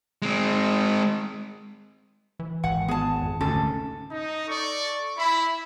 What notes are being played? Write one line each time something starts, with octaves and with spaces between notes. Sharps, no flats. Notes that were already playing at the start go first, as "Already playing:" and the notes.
G#3 C4
E3
G#1 F#5
B3 G#4 A5
F2
D2 G#2 C3 C#4 A4
D#4
A4 D5 C#6
E4 B5